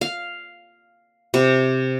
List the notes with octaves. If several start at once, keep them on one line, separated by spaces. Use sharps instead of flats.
F5
C3